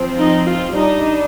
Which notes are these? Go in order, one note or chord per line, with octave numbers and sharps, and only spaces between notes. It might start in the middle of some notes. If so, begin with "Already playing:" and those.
Already playing: F3 C4
D#4
F4
G3 D4 D#4